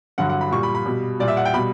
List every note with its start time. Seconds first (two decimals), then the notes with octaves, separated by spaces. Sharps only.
0.18 G2 D3 F#3 F#5
0.29 F#5
0.41 B5
0.52 A#2 G3 C#6
0.63 B5
0.75 B5
0.86 B2 G3
1.19 A#2 G3 D5
1.28 E5
1.37 F#5
1.45 G5
1.54 B2 B5
1.57 G3